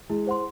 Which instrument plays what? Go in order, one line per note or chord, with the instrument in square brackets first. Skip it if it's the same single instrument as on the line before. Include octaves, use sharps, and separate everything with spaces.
[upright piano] G#3 [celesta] E4
[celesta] G#4 C5 F#5 C6